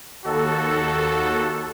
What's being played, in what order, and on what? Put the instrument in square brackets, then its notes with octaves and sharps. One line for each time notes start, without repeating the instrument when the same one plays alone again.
[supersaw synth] D#2 A4 [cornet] F#4